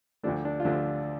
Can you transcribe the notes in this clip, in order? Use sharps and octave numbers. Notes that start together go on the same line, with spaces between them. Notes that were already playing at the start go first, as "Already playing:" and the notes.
D2 D3 F3 A3 D4
D4
F4
D2 D3 F3 A3 D4